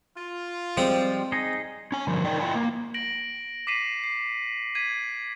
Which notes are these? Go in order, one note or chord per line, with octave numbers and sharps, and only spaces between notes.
F4
F3 G3 G#3 C4
D#4 G#4 D#5
C#4 G#5
G2 D3 F3 G3
D#4 A#4 D5 D#5 G5
E4 F4 D#5 G5 G#5
A#3
A#6 D7 F#7
D6 B6 C7 D#7 F#7
C7
G#6 B6 D#7